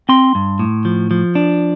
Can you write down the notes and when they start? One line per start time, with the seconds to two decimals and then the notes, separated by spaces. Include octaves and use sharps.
0.09 C4 C6
0.35 G2
0.59 A2
0.85 F3
1.11 F3
1.35 D4